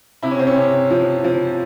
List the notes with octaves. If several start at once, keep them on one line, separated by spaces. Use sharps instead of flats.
C3 E4
C#4
C4
C#4
C3
F3
F3